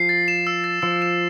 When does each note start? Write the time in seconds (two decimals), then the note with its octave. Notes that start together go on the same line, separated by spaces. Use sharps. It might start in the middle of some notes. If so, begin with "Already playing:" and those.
Already playing: F3 C7
0.09 A6
0.28 E7
0.47 E6
0.64 A6
0.82 F3 E6
1.02 E7